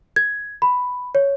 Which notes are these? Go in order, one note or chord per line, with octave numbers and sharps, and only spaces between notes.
G#6
B5
C#5